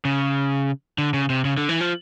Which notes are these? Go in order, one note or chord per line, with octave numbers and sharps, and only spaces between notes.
C#3
D3
C#3
C3
C#3
D3
E3
F3